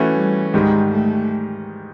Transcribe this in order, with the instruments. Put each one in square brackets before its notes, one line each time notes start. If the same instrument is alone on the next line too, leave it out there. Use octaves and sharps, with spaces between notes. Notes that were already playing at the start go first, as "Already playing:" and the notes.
Already playing: [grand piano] E3 A3 C#4 F#4
[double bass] G3
[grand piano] G#2 D#3 G3 [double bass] G#3
[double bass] A3